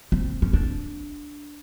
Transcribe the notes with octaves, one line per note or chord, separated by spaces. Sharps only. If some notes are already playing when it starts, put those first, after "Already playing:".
C4
C#4
D4